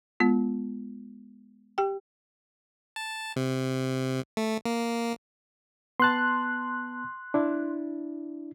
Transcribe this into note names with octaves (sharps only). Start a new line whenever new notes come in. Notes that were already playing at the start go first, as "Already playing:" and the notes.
G#3 B3 F4
G4 G5
A5
C3
A3
A#3
B3 A5 C6 F#6
D4 E4